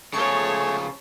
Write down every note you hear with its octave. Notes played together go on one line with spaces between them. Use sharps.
C#3 F3 A3 G#4 C#5 G#5 A5 C#6